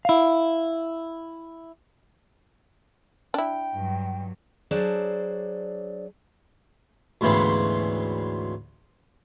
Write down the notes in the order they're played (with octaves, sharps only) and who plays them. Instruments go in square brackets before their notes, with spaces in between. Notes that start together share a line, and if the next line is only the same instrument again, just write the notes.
[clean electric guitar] E4 F5
[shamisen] D4 E4 [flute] G5
[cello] G2 F#3
[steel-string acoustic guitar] F#3 D4 G#4 C5 D5 A5
[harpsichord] D2 G#2 C#3 E3 B3 C4